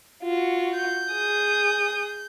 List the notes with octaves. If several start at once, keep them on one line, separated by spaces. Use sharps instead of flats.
F4 F#4
G6
G#4 D#6